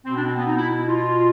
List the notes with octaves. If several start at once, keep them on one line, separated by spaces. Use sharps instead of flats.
B2 C4
D4
C4
B3
D#4
E4
E4
F4